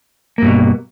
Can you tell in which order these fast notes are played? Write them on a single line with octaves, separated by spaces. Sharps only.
A#3 G2 B2